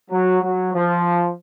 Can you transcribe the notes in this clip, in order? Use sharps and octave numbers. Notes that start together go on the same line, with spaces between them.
F#3
F#3
F3